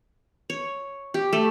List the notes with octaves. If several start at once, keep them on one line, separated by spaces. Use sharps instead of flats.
C#5
G4
A3